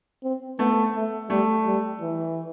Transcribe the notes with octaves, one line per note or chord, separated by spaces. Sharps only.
C4
A3 B3
A3
G3 A3
G3
E3